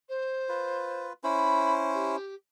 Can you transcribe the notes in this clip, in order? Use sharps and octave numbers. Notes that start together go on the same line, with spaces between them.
C5
F4 B4
C#4 E4 C5 B5
G4